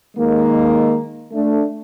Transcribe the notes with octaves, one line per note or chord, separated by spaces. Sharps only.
D#3 G#3 A#3
A3 D4